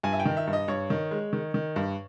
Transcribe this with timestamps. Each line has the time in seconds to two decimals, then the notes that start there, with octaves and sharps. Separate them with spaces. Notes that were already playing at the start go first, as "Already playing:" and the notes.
0.03 G2 G#5
0.13 E5
0.20 G5
0.26 D#3
0.37 E5
0.47 G2
0.53 D#5
0.68 G2 C#5
0.90 D#3
1.11 G#3
1.33 D#3
1.54 D#3
1.76 G2